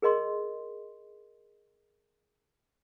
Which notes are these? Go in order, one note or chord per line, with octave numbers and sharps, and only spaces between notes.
G#4 A#4 D#5 C6